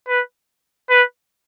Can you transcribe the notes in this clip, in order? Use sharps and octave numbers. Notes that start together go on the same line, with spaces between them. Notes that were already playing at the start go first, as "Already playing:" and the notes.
B4
B4